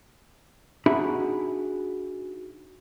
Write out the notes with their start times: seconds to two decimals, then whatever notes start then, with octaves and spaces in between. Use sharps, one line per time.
0.86 D4 D#4 F#4 G#4 E5 B5